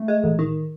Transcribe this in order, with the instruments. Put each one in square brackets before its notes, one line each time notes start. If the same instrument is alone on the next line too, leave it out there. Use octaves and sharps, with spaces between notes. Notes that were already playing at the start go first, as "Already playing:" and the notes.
Already playing: [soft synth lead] A3
[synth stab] G#3
A1
D#3